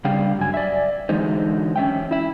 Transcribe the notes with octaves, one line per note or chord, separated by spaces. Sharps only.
C#3 G3 D4 F5 G5
F#2 G#5
D5 E5
D3 E3 F#3 G#3 D#4 C5
C#4 E5 G5
E4 E5